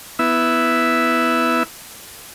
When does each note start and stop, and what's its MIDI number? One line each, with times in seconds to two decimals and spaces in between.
0.19 1.63 59
0.19 1.63 64
0.19 1.63 76